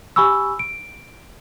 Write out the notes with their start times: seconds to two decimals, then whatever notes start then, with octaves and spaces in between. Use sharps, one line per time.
0.16 G4 G#5 B5 C#6 E6
0.59 D7